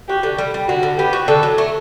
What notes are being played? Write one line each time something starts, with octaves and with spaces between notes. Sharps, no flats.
F#4 G4
D3
G3
G3
D3 F#4
D3
B3 G4
F#4
D3 A4
F#3
A3